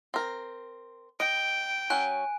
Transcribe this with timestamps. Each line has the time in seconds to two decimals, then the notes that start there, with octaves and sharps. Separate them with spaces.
0.14 C4 A#4
1.20 D#5 G5 D7
1.90 F#3 C#4 G#5 F#6